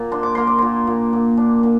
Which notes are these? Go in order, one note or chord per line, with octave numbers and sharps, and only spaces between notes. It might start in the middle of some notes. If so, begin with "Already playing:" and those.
Already playing: A#2 A#3
D4 C6
D6
A#3 C6
D6
A#2 C6
A#2
A#2
D4
A#2